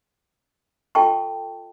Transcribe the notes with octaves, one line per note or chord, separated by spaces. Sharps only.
F4 A4 D#5 G5 A5 C#6